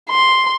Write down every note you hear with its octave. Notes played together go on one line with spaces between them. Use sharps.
C6